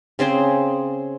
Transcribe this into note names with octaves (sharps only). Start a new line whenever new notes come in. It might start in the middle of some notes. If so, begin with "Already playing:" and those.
C#3 C4 G#4 C5